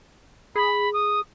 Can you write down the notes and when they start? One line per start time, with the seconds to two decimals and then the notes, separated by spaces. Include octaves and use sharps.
0.56 G#4 B5
0.93 D#6